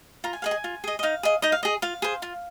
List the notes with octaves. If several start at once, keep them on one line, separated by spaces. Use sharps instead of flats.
F4 A#5
G#5
G#4 D#5 F5
G#5
F4
G#4 D#5
D#5
D#4 F5
G#4 D#5
D#4 D#5
F5
G#4 D#5
F4 F5
G#4 C5
F4